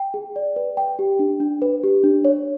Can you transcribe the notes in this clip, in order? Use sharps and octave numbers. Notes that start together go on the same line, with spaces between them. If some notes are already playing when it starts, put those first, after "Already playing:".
Already playing: G5
G#4
D5
B4
G5
G4
D4
D4
B4
G4
D4
C#5